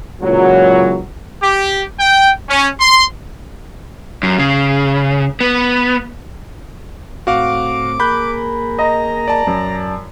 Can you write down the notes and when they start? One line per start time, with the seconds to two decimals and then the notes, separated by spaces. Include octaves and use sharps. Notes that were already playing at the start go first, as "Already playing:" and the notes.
0.21 C#2 A#2 E3 F#3
1.43 G4
2.00 G5
2.49 C#4
2.80 C6
4.23 F#2
4.39 C#3
5.41 B3
7.27 A2 C4 F#4 F5 D6
8.00 A#3 G#4 A#4 B5 F#6 G6
8.79 D#5 A#5
9.28 D5 A5
9.47 F#2